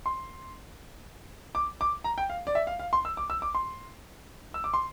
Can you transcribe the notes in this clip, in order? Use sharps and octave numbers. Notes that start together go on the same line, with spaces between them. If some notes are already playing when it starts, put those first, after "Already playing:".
C6
D6
D6
A#5
G5
F5
D5
E5
F5
F5
C6
E6
D6
E6
D6
C6
E6
D6
C6